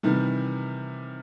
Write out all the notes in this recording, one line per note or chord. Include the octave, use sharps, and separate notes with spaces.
C3 D#3 E3 G3